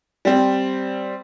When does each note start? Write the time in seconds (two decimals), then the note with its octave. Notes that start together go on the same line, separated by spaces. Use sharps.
0.25 G3 C4